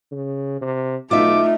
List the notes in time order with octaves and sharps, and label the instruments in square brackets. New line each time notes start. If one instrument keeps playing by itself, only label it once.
[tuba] C#3
C3
[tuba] B1 [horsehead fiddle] A3 D#4 [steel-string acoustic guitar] F4 E5 [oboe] D6